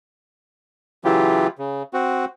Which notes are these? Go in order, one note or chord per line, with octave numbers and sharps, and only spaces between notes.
C#3 E3 F#3 E4 F4 G4
C#3
C4 F#4